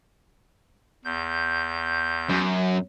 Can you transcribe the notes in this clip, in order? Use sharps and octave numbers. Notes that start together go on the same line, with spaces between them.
E2 G6
F#2